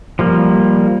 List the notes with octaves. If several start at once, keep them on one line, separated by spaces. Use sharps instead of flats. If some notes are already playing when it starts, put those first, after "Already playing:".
F3 G3 A#3